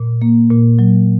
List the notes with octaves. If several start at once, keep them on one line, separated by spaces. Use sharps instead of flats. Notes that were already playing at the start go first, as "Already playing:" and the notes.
Already playing: A#2
A#3
A#2
F#3